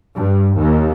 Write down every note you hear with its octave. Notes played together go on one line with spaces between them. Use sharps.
G2
D#2